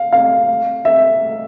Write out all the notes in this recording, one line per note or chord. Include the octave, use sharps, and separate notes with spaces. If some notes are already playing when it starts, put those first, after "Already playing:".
Already playing: F5
F5
E5